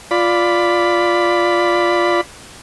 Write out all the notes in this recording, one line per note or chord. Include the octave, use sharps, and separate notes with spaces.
F4 D5 B5